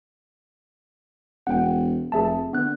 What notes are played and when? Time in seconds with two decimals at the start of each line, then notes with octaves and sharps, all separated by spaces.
1.47 E1 F#5 G5
2.12 F1 G#4 E5 A5
2.53 D3 B3 F#6